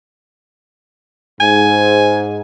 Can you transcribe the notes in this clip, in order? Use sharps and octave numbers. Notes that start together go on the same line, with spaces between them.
G#2 G#5